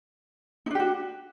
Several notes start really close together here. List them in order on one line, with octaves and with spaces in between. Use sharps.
D#4 D4 G4 F#4